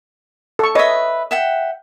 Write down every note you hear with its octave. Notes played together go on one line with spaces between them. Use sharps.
A4 C#6
B4 C#5 D#5 E5 D#6
E5 F#5 G5